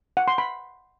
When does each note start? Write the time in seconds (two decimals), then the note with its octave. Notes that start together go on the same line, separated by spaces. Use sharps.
0.17 F#5
0.28 C6
0.38 B5